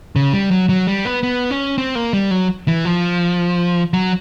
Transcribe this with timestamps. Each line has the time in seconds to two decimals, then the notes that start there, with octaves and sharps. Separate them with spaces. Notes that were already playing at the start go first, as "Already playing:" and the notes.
0.16 C#3
0.33 G3
0.51 F#3
0.69 F#3
0.87 G3
1.05 B3
1.23 B3
1.51 C#4
1.78 C4
1.95 A#3
2.13 G3
2.31 F#3
2.68 E3
2.85 F3
3.93 F#3